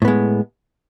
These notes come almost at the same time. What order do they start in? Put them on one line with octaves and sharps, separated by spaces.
A2 B3 G#3